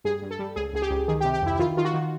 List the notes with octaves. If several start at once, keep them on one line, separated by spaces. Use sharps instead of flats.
G2 G#4
G2
A4
G3
C#2 G#4
C#2 G#4
G4
C#2
D#3 G#4
G4
C3
G4
F2 E4
E4
D#3 F4
D#3 F4
F#4
D#3